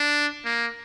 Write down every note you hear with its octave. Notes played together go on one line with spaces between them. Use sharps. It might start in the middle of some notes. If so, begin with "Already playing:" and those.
Already playing: D4
A#3